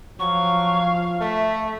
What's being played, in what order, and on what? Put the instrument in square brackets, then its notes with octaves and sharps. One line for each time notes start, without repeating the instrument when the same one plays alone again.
[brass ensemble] F3 F5 [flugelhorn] F#3 [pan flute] C#6
[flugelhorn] A3 [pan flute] E5